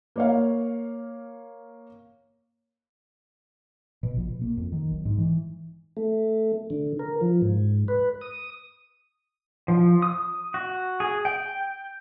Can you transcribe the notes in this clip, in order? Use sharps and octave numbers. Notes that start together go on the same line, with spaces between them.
A#3 C#5 F5
B2
A#1
B2
A#3
F2
D#3
B1
G#2
E3
A3
D3
A#4
F3
G#2
B4
D#6
F3
D#6
F#4
G#4
G5